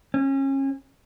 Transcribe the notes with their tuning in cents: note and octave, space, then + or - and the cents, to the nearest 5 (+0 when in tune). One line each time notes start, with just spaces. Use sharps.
C#4 -30